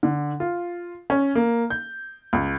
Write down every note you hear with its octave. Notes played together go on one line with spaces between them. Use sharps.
D3
F4
C#4
A#3
G6
C#2